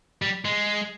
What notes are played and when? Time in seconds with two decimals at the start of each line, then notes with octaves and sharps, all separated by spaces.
0.22 G3
0.45 G#3